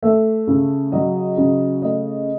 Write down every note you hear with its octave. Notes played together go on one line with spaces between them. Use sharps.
A3 E5
C#3
F#3 D#5
C#3
A3 D#5